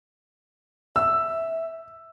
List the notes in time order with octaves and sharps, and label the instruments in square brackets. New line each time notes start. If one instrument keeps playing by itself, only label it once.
[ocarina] E5 [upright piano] E6